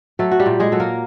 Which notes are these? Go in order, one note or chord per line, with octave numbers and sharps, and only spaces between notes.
F#3 A3 A4
F#4
G3 G4
A#2
G#3 G#4
F#3 A4
A#3 A#4